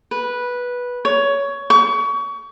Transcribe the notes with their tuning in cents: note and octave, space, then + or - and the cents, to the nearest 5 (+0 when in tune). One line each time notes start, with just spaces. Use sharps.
B4 -10
C#5 +15
C#6 +30